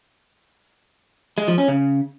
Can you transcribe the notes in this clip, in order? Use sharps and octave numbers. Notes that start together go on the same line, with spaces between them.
G#3
F3
C#4
C#3